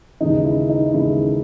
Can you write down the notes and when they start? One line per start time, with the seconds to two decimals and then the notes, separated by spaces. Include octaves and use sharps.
0.21 D#2 C#3 E3 G#3 D#4
0.44 E4
0.69 D#4
0.93 D#2 C#3 E3 G#3 E4